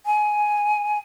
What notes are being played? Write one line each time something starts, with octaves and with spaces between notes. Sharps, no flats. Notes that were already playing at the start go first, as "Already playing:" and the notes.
G#5